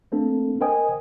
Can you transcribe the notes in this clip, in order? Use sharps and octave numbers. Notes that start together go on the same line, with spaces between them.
A3 A#3 C4 D4 A4
A#4 C5 D#5 G5 G#5 D#6